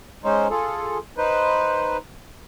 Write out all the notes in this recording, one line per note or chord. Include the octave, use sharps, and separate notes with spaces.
G#3 C#4 D#4 C5
F4 G#4 A4
D#4 B4 C5